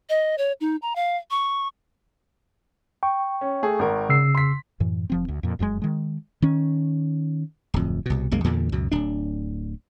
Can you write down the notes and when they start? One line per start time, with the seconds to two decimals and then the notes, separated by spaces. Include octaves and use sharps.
0.09 D#5
0.38 C#5
0.61 D#4
0.82 A#5
0.96 F5
1.31 C#6
3.03 G5 C#6
3.41 C#4
3.63 A3 G#4
3.79 G#1 A#4
4.09 C#3 E6 C7
4.35 C6 B6
4.80 F#2 A2 E3
5.10 F1 F3 C4
5.28 D2
5.43 F2 A#2
5.59 F1 F#2 A2 G#3
5.82 D#3 G#3
6.42 D#3 C#4
7.74 D1 F2
8.06 C2 B2
8.31 C2 F#2 G#3 A#3
8.44 E2 G2 A#2 D3
8.72 C#2 F#2 B2
8.92 D1 D4